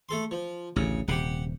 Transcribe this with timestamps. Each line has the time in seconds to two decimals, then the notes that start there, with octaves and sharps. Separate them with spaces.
0.09 A3 A4 C6
0.31 F3
0.76 A1 D2 C#3
1.08 D#1 C3 G4 F#5